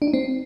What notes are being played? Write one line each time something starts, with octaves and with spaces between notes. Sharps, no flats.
D4
D#4
C4